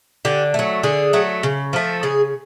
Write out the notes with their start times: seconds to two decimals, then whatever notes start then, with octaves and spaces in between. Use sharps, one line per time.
0.25 D3 G4
0.54 F#3 A3
0.83 D3 G#4
1.13 F#3 A3
1.43 C#3
1.73 F3 A3
2.03 C#3 G#4